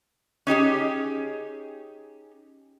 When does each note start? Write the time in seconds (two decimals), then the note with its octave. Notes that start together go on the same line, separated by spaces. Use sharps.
0.47 C#4 D#4 G4 G#4